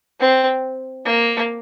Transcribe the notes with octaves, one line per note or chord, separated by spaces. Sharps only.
C4
A#3